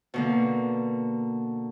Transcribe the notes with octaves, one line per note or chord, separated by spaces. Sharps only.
B2 D3 A#3